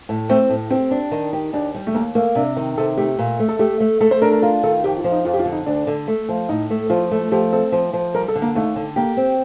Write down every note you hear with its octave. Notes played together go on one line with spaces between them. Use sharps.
A2
A3 C4
A2
C4 G4
D4
D#3
G4
D#2 D4
G3
A3
D#2 A#3
A3 A#3
C3 D4
D#3
C3 A4
A3 G4
A#2
A3
A4
A3 G4
A3
A3 A4
C5
D4 A#4
A#4
F4 A#4
D#3 A4
F2 G4
F4
F3
D#4
F2 F4
G4
F4
D3
D#4
D2 D4
D3
A3
F3
A2 D#4
A3
F3 F4
A3
F3 G4
C4 A4
F3
F3
G3 A#4
A4
D3
A#3
D#2 A3
D3
A#3 G4
C4